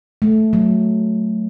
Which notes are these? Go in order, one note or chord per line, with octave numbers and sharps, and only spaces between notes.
A3
F#3